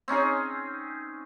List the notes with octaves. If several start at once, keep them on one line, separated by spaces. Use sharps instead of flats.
C4 C#4 D#4 G#4